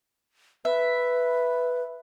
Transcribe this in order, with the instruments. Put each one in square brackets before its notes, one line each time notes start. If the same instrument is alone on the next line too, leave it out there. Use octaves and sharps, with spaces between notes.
[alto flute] B4 [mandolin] E5